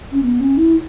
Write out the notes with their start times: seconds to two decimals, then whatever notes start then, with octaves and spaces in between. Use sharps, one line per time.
0.12 C#4
0.23 B3
0.40 C#4
0.57 E4